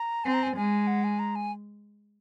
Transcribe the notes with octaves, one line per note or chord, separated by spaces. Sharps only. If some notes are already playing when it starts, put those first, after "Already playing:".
Already playing: A#5
C4 G#5
A#5
G#5
G#3 G#5
F#5
G#5
A#5
G#5